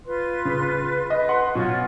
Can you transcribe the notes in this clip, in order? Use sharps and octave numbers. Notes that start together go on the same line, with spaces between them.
F4 B4 C6
C#3
B4 D#5
F#5 C6
B2 F#3 C#4 F4